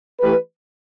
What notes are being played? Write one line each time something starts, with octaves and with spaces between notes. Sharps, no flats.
E3 A3 G4 B4